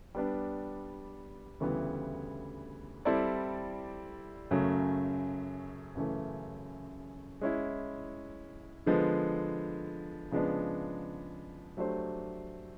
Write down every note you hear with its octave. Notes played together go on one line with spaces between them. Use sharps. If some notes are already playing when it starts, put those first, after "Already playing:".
G3 B3 D4
D2 C#3 E3 G3 B3
G3 C4 E4 A4 D5
F#2 C#3 F#3 A3
F#2 C#3 E3 A3
G#3 C#4 E4
D3 F3 G#3 B3
C#3 F3 G#3 B3 D4
F#3 A3 D4 G4 C5